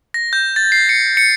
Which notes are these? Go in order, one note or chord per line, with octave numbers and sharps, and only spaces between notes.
A#6
G6
A6
C7
C#7
C#7